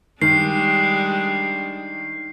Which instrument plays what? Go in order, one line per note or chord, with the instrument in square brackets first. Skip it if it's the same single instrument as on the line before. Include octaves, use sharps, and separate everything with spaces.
[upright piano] D#3 [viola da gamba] G3 G#3 D4 [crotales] C7